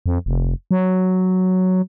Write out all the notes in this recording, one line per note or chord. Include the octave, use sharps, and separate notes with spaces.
F2
F1
F#3